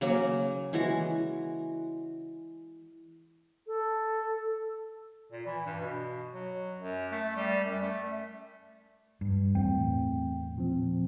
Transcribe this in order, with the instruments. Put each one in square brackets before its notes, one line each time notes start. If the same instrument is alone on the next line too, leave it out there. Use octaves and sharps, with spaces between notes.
[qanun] C#3 F#3 A#3
E3 G#3 F#4
[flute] A4
[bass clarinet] A#2
E3
G2
B2
F#3
F#2
A3
G3
F#2
A3
[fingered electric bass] G2
[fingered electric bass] E2 A2 [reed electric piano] C4 G5
[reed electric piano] A#2 F3 C4